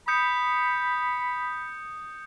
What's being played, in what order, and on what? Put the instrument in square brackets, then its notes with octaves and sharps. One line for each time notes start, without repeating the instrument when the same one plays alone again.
[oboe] B5 [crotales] D#6 G6 C#7